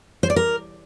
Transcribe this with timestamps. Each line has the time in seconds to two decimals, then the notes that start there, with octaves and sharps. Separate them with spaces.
0.23 C5
0.30 D5
0.36 A#4